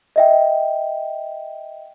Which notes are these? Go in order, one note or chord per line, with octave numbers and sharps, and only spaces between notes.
D#5 E5 G5